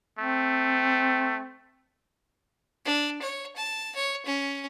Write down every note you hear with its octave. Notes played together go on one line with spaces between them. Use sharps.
A3 C4
D4
C#5
A5
C#5
C#4